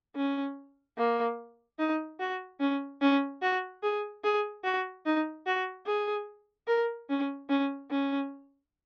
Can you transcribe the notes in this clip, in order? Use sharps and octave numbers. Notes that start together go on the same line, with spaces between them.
C#4
A#3
D#4
F#4
C#4
C#4
F#4
G#4
G#4
F#4
D#4
F#4
G#4
A#4
C#4
C#4
C#4